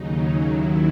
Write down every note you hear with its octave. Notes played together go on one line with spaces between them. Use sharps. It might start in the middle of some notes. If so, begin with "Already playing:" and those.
Already playing: D#2 C#3 F#3 D#4
D#4
D#2 D#3 F#3 E4